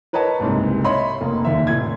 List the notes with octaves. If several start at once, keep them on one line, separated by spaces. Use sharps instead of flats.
A#4 B4 C#5 D#5 A5
F#1 C2 G#2 C3
C#5 D#5 E5 B5 C6
F1 A#3
D#2 E5
F1 A2 G#6